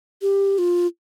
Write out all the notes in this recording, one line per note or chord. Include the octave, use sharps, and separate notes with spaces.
G4
F4